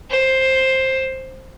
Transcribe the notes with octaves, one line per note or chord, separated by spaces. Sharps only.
C5